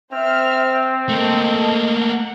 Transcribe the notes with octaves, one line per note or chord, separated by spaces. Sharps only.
C4 C5 E5 F6
A3 A#3 A4 D#5
F#5